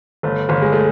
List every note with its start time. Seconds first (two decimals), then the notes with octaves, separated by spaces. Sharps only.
0.23 G1 A3
0.49 G1
0.62 G#3
0.72 A3